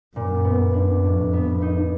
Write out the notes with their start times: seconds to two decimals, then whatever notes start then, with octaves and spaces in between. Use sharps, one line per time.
0.16 F#2 A#2
0.44 B3
0.60 F#2
0.74 D4
1.03 F2 A2
1.33 B3
1.62 D#4